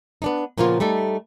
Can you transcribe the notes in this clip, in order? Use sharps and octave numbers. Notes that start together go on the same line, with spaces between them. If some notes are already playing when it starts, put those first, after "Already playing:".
B3 D4 D#4
A#2 C#3 F3 A#3 B3 F4
G3 A3 D#4 A4